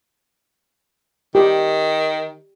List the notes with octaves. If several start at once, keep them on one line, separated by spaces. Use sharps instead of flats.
D#3 G4 G5